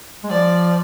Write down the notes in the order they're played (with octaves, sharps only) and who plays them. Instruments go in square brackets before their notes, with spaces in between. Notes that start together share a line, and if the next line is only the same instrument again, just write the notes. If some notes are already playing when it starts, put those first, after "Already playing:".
[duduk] G#3
[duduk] F3 [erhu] D5